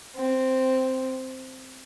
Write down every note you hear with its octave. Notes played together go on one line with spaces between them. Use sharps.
C4